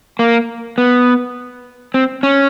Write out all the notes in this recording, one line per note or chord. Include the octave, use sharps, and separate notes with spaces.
A#3
B3
C4
C#4